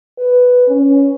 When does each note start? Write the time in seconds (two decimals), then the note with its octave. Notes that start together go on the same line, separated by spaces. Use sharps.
0.18 B4
0.68 C#4